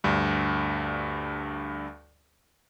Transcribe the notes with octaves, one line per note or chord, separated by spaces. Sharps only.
D2 G2